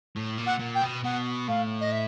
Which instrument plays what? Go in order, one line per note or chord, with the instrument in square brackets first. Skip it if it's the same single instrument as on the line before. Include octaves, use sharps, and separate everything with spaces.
[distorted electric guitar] A2
A#2
[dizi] F#5
[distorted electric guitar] A#2
[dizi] G5
[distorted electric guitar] B2
[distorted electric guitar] B2 [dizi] F#5
[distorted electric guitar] A2 [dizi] F5
[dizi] D#5
E5